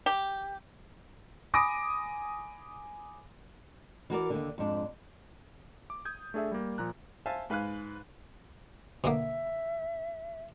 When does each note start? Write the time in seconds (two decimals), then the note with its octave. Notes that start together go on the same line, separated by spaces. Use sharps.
0.06 G4
1.54 G#5 B5 D6 D#6 A#6 D7
4.10 E3 F#4 A#4 D5
4.30 D#2 D3
4.58 F2 G#2 D4
5.90 D6
6.05 D#6 G6 G#6
6.34 A3 D4 G#4 A4 E5
6.51 G3 A#3
6.78 A#2 F3 A#5 F#6
7.26 C5 E5 F5 G#5 A5
7.50 G#2 B4 F5 G#5 F#6
9.04 B2 D3 A#3 E5